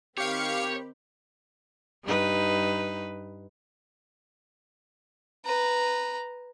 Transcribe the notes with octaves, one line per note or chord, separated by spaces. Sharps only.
D#3 C4 G4 C#5 F5 B5 C#7
G2 D#4 B4
B4 A#5